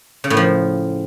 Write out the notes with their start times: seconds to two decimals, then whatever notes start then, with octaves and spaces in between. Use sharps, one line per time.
0.24 C#3
0.30 A2
0.37 F3